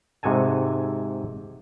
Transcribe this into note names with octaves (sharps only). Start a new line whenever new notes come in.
G#2 C3 F#4 A4 G#5 A5